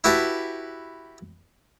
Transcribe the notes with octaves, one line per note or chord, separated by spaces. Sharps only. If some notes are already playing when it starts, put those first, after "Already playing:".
E4 F#4 G4 B4 E5 A5